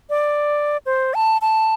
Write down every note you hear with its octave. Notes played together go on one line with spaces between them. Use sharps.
D5
C5
A5
A5